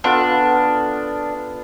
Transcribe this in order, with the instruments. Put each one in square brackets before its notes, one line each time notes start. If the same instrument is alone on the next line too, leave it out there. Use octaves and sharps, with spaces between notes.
[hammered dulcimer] B3 F4 A4 [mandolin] D4